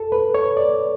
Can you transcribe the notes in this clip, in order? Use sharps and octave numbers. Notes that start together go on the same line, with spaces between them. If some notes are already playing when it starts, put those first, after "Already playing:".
Already playing: A4
B4
C#5
D5